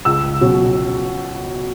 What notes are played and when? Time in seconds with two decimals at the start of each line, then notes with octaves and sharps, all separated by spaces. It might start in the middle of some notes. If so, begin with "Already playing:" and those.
0.05 C#2 E6
0.41 B2 F#3 C#4